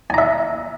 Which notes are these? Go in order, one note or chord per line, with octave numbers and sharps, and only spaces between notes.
E5 G#5 A#5